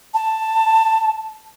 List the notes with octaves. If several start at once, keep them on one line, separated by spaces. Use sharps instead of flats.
A5